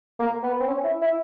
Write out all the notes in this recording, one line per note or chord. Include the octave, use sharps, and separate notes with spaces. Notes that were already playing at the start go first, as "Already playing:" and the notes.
A#3
B3
C4
C#4
E4
E4